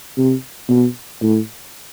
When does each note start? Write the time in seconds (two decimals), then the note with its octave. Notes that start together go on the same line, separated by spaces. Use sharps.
0.17 C3
0.69 B2
1.22 A2